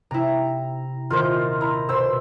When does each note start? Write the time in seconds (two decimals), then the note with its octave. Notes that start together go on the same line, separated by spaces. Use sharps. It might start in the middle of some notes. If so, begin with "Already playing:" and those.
0.11 C3 E4 A#5
1.10 D#1 F4 A#4 C5 G6
1.61 E4 A#5
1.89 B2 C5 E6